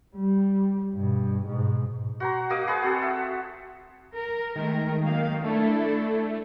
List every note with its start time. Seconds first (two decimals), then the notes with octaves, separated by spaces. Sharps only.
0.16 G3
0.94 G2 B2
1.46 G#2 B2
2.20 F#4 C5 A#5
2.50 A#3 F#4 D#5 D6
2.67 G#4 B4 C5 D#5
2.82 C4 F#4 A4
3.02 E5
4.15 A#4
4.56 D#3 G#3 A3 A#4
5.02 F#3 A#3 F5
5.44 A3 D4 E4 A4